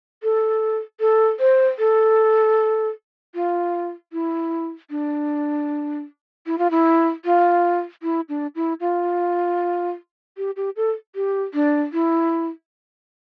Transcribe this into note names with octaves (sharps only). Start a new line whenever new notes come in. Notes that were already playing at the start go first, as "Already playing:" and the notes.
A4
A4
C5
A4
F4
E4
D4
E4
F4
E4
F4
E4
D4
E4
F4
G4
G4
A4
G4
D4
E4